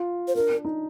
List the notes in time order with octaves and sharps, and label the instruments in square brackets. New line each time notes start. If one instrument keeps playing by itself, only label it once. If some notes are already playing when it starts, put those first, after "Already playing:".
Already playing: [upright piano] F4
[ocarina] C5
[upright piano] D4 [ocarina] A#4
[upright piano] D4
D#4